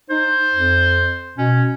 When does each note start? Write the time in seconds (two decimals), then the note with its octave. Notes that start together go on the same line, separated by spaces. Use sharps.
0.10 D#4 C5
0.53 F2
1.38 B2 C#4